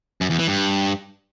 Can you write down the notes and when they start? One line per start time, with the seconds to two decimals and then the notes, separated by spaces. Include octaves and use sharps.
0.21 F#2
0.30 E2
0.39 E3
0.48 G2